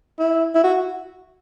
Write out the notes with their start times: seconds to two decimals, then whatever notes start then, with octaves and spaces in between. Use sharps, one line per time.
0.19 E4
0.55 E4
0.63 F#4